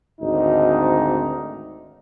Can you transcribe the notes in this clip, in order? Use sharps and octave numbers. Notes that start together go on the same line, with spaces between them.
G#1 D2 D#4